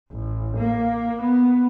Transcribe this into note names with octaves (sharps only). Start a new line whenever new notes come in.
A1
A#3
B3